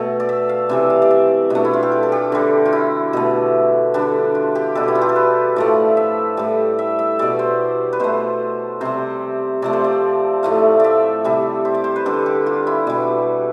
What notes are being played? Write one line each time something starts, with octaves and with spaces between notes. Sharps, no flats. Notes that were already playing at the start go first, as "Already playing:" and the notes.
Already playing: B2 A3 E5
D5
E5
F5
C3 E3 G3 E5
F5
D5
E5
B2 A3 D4
E4
F4
G4
A4
A4
G4
D3 G3
F4
E4
B2 A3
D3 G3 D4
F4
G4
B2 G3 A4
E4
F4
G4
A4
B4
A2 F3 A3 D5
E5
A2 G3
E5
E5
B2 G3 D5
C5
B4
B2 A3 C5
C3 G3 C5
C3 F3 A3 D5
C5
D5
A2 F3 A3 F5
D5 E5
C3 G3
C5
D5
C5
B4
D3 G3 A4
G4
F4
E4
B2 G3 D5